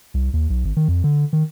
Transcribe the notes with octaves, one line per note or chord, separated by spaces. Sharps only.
C2
D#2
B1
G#1
D#3
F2
D3
D#3